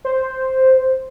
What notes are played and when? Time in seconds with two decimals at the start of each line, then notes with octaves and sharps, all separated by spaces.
0.05 C5